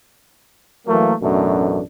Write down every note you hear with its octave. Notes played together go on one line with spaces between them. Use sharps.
E3 F#3 A3 A#3
A1 F#2 B2 A3 D4